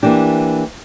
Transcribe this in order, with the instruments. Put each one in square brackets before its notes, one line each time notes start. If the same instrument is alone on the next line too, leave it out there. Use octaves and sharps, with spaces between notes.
[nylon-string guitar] E3 A#3 D4 G4